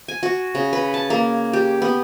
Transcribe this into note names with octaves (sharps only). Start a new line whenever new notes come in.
G#5
F#4
C#3
B4
A5
A#3
G4
B3